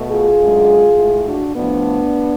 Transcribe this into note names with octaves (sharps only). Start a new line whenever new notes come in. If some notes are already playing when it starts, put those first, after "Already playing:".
Already playing: B2 A3
F4 G#4
F#2 D3 G#3
A2 G#3
D4 F#4
A2 F3 A3 B3 D4